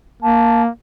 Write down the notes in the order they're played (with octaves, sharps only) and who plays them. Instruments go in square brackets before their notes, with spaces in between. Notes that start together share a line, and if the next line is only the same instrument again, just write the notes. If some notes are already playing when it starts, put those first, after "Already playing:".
[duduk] A#3 [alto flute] A5